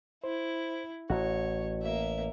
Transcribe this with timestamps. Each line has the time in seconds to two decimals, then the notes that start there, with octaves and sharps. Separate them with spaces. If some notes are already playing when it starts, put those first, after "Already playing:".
0.24 E4 C5
1.10 A1 F#4 C#5
1.81 A#3 E5